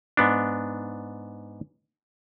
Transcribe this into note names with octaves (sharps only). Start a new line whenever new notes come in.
G#2 B3 D4